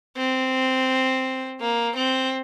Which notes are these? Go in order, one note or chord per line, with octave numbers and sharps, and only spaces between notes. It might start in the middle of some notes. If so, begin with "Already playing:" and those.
C4
A#3
C4